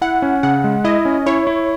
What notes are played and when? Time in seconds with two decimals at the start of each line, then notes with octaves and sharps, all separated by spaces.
0.01 E4 F#5
0.22 C#4
0.43 C#3 F#5
0.64 G#3
0.84 E4 D#5
1.05 C#4
1.26 E4 C#5
1.47 E4